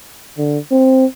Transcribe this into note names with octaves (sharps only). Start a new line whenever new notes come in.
D3
C4